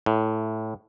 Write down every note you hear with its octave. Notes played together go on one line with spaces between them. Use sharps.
A2